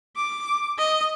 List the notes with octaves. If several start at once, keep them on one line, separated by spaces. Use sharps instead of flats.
D6
D#5